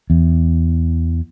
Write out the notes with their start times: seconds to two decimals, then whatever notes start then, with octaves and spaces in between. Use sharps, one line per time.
0.10 E2